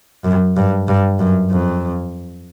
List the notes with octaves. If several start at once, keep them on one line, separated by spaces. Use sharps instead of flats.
F#2
G2
G2
F#2
F2